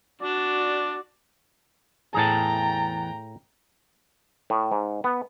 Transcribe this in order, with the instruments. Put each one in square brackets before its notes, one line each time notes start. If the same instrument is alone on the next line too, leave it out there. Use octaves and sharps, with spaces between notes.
[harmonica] D4 [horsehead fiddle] F#4 [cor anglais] D5
[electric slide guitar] E2 E3 A5 [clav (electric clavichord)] A2 G#4 [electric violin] G5 A#5
[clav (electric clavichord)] A2
G#2
B3